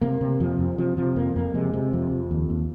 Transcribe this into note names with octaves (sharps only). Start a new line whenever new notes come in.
C3 A#3
C3
F2 F3
F2
C3 F3
C3 F3
F2 A#3
F2 A#3
C3 G#3
C3
F2 F3
F2
D#2
D#2